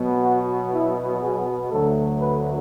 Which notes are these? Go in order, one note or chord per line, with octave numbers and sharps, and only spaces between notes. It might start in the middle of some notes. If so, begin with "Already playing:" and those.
Already playing: B2 F#3 B3
F#4
E4
G#4
D2 D3 F#3 A3 A4
B4